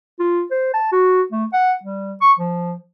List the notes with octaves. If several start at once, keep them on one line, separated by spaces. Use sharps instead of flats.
F4
C5
A5
F#4
A3
F#5
G3
C#6
F3